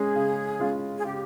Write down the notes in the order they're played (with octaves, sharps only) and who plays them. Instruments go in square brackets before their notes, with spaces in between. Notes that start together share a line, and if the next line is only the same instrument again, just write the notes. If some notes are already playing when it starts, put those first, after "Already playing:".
Already playing: [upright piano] G#3 C#4 [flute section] G#4
[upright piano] C#3
G#3 C#4 F4
[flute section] G#4
[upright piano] C#3 [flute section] G4